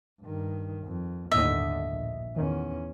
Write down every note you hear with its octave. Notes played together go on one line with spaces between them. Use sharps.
G2 D#3
F2
G1 D#2 A2 D3 D#5 E5
A#1
E2 D#3 C#4